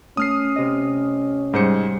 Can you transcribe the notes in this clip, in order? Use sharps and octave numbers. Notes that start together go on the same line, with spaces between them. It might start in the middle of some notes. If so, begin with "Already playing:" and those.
A3 C#4 D#6 F6 C7
C3 D#5
G#2 G3 G#4 C5 G6 C#7